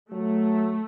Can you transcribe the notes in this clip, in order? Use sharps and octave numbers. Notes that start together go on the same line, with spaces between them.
F#3 A3